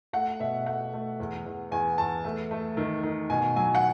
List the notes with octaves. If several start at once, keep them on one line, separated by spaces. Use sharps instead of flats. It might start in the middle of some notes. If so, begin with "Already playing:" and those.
A3 F#5
B2 E5
A3 F#5
A3
E2
E2
E2 G#5
E2 A5
A3
A3
D#3
D#3
B2 G#5
F#3 G#5
F#5